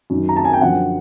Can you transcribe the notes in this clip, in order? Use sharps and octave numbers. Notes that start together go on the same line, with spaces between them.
F#2 D#3
A#5
A5
G#5
G5
F#2 D3 F3 F#5